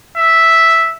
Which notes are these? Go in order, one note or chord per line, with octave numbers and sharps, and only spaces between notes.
E5